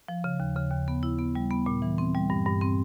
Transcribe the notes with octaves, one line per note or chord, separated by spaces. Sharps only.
F3
C#3
D#2
C#3
D#2
B3
E4
B3
G3
B3
A#2
E3
C4
G3
G2
G2
C4